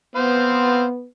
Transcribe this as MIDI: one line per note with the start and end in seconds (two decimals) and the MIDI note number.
0.16 1.06 59
0.16 0.84 60
0.16 0.84 72
0.16 0.84 77